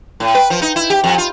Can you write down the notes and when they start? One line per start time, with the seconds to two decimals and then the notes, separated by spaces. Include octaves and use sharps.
0.20 A2
0.35 B4
0.50 F3
0.62 D#4
0.76 E4
0.90 G4
1.04 F2
1.18 F4